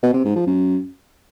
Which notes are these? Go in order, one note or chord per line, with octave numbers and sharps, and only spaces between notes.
B2
C3
G#2
F3
F#2